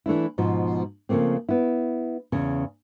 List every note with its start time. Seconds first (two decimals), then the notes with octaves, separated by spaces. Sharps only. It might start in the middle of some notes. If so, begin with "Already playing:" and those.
0.06 E3 A3 D4 E4
0.38 G#2 B2 F3
1.09 C#3 F3 A3 A#3 C4
1.49 B3 E4
2.32 E2 C#3 C#4